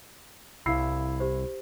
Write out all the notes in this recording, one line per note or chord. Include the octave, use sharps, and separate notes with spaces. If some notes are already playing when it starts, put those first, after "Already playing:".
C2 E4 F5 E6 C7
G4 C5